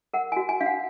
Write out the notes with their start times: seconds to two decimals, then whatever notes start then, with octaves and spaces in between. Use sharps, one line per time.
0.14 A#4 F#5
0.32 F#4 G#5
0.49 G#5
0.61 D4 F5
0.66 F#5